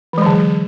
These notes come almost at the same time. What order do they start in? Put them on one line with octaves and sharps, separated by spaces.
E3 G#3 F#3 D3